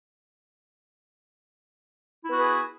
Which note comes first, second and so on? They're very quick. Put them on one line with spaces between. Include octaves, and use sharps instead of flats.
E4 B3 F#4 B4 G#4